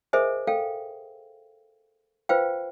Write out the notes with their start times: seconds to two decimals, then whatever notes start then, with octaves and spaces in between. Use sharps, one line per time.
0.13 G#4 A#4 C5 D#5 E5 G#5
0.47 A4 F5 G5
2.29 F4 B4 C5 F5 G5